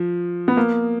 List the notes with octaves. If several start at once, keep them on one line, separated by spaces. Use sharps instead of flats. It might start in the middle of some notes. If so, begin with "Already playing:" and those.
Already playing: F3
B3
A#3